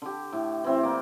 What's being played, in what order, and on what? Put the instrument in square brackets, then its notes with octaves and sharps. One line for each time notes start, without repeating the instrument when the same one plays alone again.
[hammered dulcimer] D3 G4
A2
E3 C4
A#3 D5